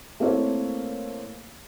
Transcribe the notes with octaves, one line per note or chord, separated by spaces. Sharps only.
A3 A#3 C4 E4 A#4 C#5